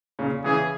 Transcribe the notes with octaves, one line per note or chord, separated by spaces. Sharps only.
A#2 C#3
C#3 E3 G#4